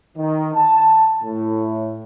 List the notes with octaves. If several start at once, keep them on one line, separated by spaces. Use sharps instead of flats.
D#3
A5
A2